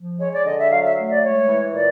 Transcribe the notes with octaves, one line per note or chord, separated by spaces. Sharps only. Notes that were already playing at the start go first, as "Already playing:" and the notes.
Already playing: F3
G#3 C#5
D5
D3 D#5
E5
F#3 F5
E5
A3
D5
G#3 C#5
E3
A#2 D5